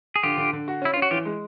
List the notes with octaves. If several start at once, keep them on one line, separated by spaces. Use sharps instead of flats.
G#4
D3 F4 G4
D3
D3
F#4
C#4 E4
C#4 F4
F#4
E3 F4 G4
G#3